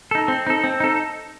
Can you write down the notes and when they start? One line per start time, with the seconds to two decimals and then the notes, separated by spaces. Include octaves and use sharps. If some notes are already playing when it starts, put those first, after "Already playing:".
0.11 D#4 A4
0.28 C4
0.47 D#4 A4
0.64 C4
0.80 D#4 A4